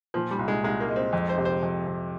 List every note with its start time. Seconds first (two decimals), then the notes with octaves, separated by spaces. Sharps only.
0.14 A#2 F3
0.31 G3
0.39 C2
0.48 G#3
0.64 C2 G#3
0.80 A#3
0.89 G#3
0.96 C4
1.13 F2
1.29 C5
1.38 C3
1.45 C5
1.63 F2
1.87 F2